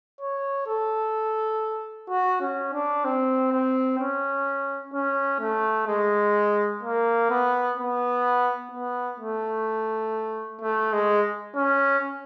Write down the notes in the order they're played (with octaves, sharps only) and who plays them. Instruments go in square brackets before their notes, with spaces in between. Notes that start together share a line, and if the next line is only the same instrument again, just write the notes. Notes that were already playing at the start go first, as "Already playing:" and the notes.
[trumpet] C#5
A4
F#4
C#4
D4
C4
C4
C#4
C#4
A3
G#3
A#3
B3
B3
B3
A3
A3
G#3
C#4